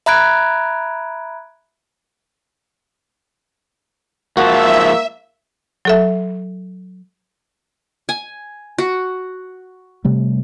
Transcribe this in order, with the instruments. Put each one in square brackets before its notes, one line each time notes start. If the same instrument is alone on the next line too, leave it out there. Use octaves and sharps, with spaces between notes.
[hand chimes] E5 A#5 B5 F#6 G#6 D7
[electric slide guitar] G#2 F3 A5 [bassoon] A#3 [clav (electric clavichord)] F#4 [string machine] E5
[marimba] F#3 A4 E5
[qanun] G#5
F#4
[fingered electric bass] C3 G3 A3